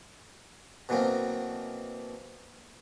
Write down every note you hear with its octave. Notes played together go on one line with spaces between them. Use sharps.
B2 E3 F#3 A#3 C4